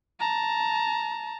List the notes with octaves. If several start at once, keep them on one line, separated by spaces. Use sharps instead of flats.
A5 A#5